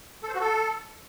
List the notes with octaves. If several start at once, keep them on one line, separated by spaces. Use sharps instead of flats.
A4
C5
F#4
A4